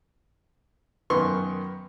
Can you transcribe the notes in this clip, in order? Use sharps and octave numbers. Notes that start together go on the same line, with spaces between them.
F#2 D#3 B3 C6 C#6